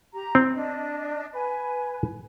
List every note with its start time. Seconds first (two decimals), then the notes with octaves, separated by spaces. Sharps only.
0.14 G4 A#5
0.35 C4
0.53 D4 D#5
1.34 B4 G#5